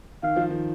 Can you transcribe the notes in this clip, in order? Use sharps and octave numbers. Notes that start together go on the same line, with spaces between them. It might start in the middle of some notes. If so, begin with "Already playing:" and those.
D#3 F5
F3
D#3